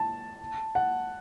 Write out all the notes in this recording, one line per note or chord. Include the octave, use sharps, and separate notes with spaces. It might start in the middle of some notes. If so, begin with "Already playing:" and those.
Already playing: A5
F#5